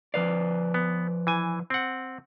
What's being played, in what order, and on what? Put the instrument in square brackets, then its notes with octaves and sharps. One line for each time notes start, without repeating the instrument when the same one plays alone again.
[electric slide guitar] F3 B4 D5 [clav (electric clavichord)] F5
[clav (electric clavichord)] B3
E3 G#5
C4 F#5